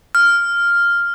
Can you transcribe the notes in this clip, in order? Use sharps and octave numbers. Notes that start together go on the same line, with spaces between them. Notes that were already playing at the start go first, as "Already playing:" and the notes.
F6